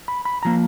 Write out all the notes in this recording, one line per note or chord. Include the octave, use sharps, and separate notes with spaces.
B5
B5
F3 A#3 A#5